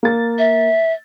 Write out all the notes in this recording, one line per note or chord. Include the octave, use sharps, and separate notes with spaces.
A#3 A6
E5